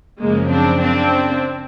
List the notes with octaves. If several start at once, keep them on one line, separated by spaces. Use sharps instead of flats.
F#2 C#3 F3 G#3 A#3
C4 D4
C4 D4